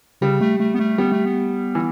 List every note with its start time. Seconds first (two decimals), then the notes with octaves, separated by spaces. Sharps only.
0.21 C#3 G3
0.41 A3
0.60 A3
0.74 B3
0.79 A3
0.98 G3 B3
1.12 A3
1.25 B3
1.75 E3